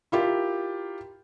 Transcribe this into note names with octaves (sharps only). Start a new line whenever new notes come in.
E4 F4 G4 A#4